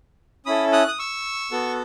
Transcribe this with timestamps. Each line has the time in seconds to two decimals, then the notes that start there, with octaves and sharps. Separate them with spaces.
0.46 C#4 E4 A4 B5 D#6
0.72 D#6 F#6
0.88 D#6
0.99 C#6 E6
1.51 B3 F#4 A4